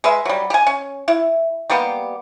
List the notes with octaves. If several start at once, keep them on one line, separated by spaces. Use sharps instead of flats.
G#3 B4 E5
F#3 G3
G4 G#5
C#4
E4
G3 A#3 B3 G4